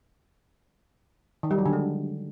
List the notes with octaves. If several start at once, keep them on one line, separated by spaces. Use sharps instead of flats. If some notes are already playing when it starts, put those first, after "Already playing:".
D#3
G3
F#3
D3
G#3